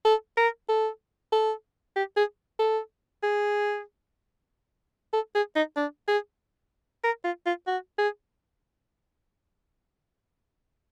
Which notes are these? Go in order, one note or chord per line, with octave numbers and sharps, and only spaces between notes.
A4
A#4
A4
A4
G4
G#4
A4
G#4
A4
G#4
D#4
D4
G#4
A#4
F4
F4
F#4
G#4